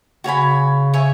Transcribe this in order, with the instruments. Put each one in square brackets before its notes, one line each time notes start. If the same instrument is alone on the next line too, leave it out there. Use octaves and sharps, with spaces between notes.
[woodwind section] C#3 [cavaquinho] F#4 C#5 G#5 B5
[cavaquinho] C#5 E5 G#5